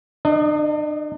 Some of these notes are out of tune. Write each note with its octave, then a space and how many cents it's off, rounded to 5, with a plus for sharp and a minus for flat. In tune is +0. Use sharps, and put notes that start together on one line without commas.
D4 +40 D#5 +0